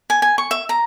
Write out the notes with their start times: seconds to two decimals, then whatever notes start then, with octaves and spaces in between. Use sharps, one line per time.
0.10 G#5
0.22 G#5
0.38 C#6
0.51 E5
0.69 A#5